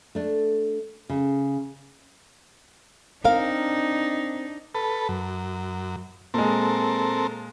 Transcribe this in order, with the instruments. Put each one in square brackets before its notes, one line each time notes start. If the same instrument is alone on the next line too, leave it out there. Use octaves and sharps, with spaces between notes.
[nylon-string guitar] A3 D4
C#3
[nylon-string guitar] C4 A#4 F5 [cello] D4 D#4
[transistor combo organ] A4 B4
F#2
[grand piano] A#2 G#3 [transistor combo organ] C4 A4 A#4